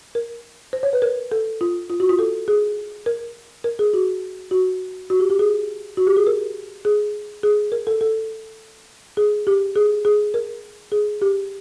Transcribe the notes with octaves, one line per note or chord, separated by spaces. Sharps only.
A#4
C5
C#5
B4
A#4
A4
F4
F4
F#4
F4
A4
G#4
A#4
A#4
G#4
F#4
F#4
F#4
G4
G4
G#4
F#4
G4
G#4
A#4
G#4
G#4
A#4
A4
A4
G#4
G4
G#4
G#4
A#4
G#4
G4